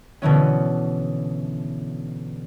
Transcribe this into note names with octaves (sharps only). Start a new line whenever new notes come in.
B2 D3 E3 C#4